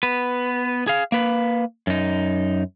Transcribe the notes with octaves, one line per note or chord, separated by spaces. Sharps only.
B3 B4
G#4 F5
A#3 B4
F#2 D#4